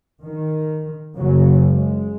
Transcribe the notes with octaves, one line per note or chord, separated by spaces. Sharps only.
D#3
F#1 F#2 C#3 F#3
G#3